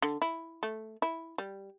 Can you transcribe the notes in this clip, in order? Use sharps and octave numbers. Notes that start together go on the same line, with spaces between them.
D3
E4
A3
E4
G3